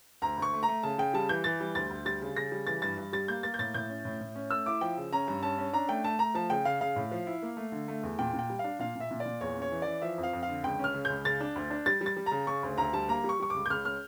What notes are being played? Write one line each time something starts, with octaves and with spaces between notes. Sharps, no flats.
D2 A#5
D2 C#6
A3
A#5
A3
C#3 A5
C#3 G5
G3 A5
E3 G6
E3 A6
G3
D2 A6
D2
G3 A6
C#3
C#3 A#6
G3
E3 A6
G2 A6
G2
G3 A6
A#3 G6
A#3 A6
G6
A2 A6
A2 G6
C#4
A2
A2
C#4
A3 E6
E4 D6
F3 G5
C#3
C#4 A#5
G2
C#4 A5
C#4
D4 A#5
A3 G5
A3 A5
A3 A#5
F3 A5
C#3 G5
C#3 F5
C#3 F5
A2
F3
E4
A#3
A3
D3
A3
E2
A#2 G5
A#2
G5
G3
F5
D4
A#2 F5
A#2
E5
A#2
D5
A#2
E2 C#5
C#4 C#5
E3
E3 D5
F3 E5
F2
F5
F2
F5
D3
C#2 G5
C#4 F6
C#3
C#2 G6
C#3 A6
D4
D2
D4
G3 A6
G3
A6
G3
A#5
C#3
C#3 C#6
D2
D2 A#5
G3 A5
A#3 A#5
G3
C#6
G3 C#6
C#2 D6
G6
C#2 F6
C#4 F6